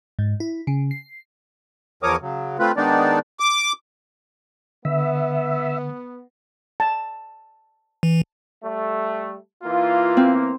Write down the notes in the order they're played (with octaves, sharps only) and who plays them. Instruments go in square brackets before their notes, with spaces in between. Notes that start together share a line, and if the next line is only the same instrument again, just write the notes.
[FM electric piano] G#2
E4
C#3
C7
[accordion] E2 F3 A#4 C#5 D6 D#6
C#3 F#3
A3 C4 F4 B4
D#3 G#3 B3 D4 D#4 D5
D6
[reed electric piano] D3 [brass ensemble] B3 [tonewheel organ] E5
[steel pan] A5
[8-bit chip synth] E3
[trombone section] G3 A3
[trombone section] E3 A#3 [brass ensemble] F4
[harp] C4